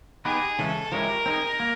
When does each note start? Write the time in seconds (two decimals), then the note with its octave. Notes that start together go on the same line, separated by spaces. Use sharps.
0.25 B3 D#4 G4 G#4 B4
0.59 C#3 E3 G#3 C#4 A4
0.92 F3 G#3 C#4 E4 G4 A#4
1.26 C4 D#4 G#4
1.60 A#3